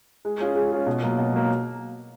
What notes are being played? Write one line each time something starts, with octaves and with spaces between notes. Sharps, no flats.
G#3
C#4 F4 G#4
G#3
C#4 F4 G#4
B2
F#3 A#3
B2
F#3 A#3